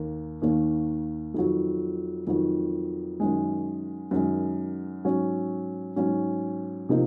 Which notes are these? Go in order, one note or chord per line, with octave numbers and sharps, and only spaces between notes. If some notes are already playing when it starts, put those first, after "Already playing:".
Already playing: D#2 D#3 A#3
D#2 D#3 A#3
F2 D#3 F#3
F2 D#3 F#3
F#2 D#3 G#3
F#2 D#3 G#3
G#2 F#3 C#4
G#2 F#3 C#4
C3 F3 A#3 D#4